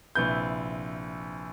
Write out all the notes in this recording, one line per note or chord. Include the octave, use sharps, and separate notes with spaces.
A#1 C3 E4 B4 G6